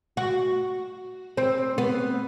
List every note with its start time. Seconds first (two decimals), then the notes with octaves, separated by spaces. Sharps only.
0.17 F#4
1.37 C4
1.78 B3